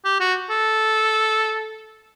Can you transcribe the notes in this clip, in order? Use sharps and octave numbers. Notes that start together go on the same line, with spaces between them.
G4
F#4
A4